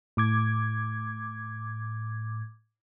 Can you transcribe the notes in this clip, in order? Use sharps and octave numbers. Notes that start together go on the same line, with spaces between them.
A2 D6 G#6